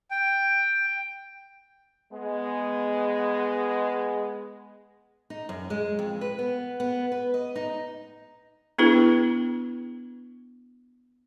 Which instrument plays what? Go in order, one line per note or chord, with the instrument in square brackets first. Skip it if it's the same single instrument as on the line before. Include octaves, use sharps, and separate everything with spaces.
[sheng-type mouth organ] G5
[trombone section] G#3 B3
[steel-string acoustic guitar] D#4
F#2
G#3
F2
B4
B3
B3
B4
D#5
D#4
[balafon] B3 D4 E4 G#4 B4